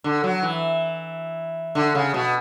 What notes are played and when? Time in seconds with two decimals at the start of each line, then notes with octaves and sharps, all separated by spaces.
0.04 D3
0.24 F#3
0.43 E3
1.75 D3
1.95 C#3
2.14 B2